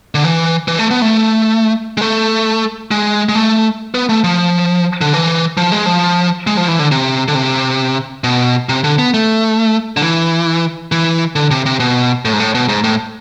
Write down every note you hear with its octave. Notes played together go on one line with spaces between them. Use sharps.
D3
E3
E3
A3
B3
A3
G#3
A3
G#3
G#3
A3
B3
A3
F3
D3
E3
F3
G#3
F3
G#3
F3
E3
D3
C3
D3
C3
B2
C3
D3
B3
A3
D3
E3
E3
D3
C3
C3
B2
A2
G#2
A2
B2
G#2
A2